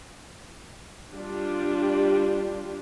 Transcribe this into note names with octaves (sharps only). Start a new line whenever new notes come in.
G3 D4 F4 G4